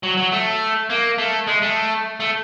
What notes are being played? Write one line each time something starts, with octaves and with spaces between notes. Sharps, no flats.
F#3
F#3
A3
A#3
A3
G#3
A3
A3